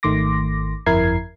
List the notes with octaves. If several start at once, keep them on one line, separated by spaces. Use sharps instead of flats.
G#1 D#3 A3 C6 D6 A#6
G1 F2 E4 A#4 G#6 C7